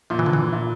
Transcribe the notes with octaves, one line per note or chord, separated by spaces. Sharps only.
A#2 F3
E3
D3
E3
A#2